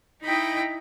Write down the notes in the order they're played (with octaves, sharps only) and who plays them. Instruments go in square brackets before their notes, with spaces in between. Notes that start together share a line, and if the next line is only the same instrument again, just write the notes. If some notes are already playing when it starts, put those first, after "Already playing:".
[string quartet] D#4 E4 D#5 G5 B5